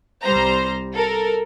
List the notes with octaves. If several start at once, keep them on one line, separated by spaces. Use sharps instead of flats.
C2 G3 C5 A#5
A4 A#4